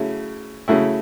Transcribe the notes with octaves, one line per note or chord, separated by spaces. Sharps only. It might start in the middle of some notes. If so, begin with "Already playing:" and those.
Already playing: C#3 F#3 A3 E4
C#3 F#3 A3 E4